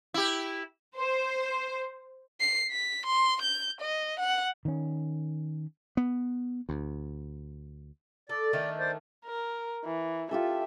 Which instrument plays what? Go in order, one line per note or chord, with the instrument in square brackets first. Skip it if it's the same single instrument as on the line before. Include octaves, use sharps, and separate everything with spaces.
[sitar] E4 G4
[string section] C5
[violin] C7
B6
C6
G6
D#5
F#5
[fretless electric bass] D#3 C#4
[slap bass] B3
D2
[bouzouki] A4 [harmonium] D5
[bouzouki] D#3 A3 D4
[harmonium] C5 D5
[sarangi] A#4
E3
[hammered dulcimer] F4 G4 A4 [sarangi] E5